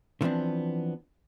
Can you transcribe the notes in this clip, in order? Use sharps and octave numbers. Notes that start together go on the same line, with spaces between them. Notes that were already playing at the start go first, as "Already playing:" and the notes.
D3 E3 F3 B3 C4 D4